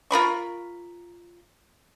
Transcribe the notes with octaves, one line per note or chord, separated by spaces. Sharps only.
F4 A#4 B5 C#6